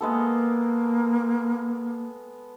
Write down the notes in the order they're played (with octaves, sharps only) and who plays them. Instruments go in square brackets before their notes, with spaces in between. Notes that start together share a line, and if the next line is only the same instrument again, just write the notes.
[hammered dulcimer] G#3 B3 A4 [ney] A#3